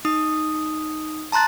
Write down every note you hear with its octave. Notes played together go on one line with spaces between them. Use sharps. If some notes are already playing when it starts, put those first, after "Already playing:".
D#4 D#6
A5 A#5 C6 F#6 A6